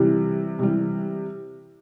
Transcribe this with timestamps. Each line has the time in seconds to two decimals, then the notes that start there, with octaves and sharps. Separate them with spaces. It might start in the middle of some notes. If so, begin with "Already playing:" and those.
Already playing: C3 E3 G3
0.59 C3 E3 G3